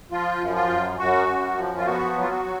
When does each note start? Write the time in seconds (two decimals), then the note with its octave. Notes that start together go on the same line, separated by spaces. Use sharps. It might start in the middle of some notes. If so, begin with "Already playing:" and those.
0.12 F3 F4
0.41 F#2
0.55 F4
0.70 F#2
0.99 F#2 F#4
1.28 F#2
1.57 F3
1.78 F4
1.86 B3 F#4
2.16 F#3
2.21 F4
2.30 F#4
2.44 F#3